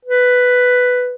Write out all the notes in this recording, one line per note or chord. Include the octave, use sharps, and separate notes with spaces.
B4